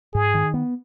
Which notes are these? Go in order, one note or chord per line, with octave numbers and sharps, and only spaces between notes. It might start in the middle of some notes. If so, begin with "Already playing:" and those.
G#2 G#4
D#3
B3